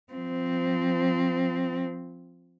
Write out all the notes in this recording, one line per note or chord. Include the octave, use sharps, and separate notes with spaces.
F3 C4